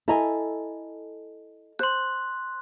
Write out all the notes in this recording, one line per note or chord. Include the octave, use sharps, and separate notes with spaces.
E4 A4 D#5 G#5 A#5
C5 C6 F#6